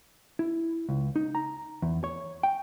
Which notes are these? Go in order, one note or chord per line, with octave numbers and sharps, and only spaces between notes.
E4
C#2
D#4
A#5
E2
C#5
G5